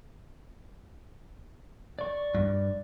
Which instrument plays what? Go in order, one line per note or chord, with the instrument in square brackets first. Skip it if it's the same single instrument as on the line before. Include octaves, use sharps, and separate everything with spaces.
[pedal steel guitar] D5 C#6
[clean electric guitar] G2